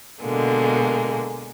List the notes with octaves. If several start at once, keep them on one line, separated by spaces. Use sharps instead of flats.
B2 D3 G#3 A#3